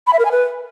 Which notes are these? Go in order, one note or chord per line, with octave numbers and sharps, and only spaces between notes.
B5
E5
A#4
G#5
B4